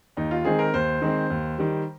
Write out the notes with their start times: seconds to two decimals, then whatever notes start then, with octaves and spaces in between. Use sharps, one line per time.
0.17 D#2 D#4
0.31 F4
0.45 D#3 G#3 C4 G#4
0.59 A#4
0.74 D#2 C5
1.02 D#3 G#3 C4
1.30 D#2
1.58 D#3 G3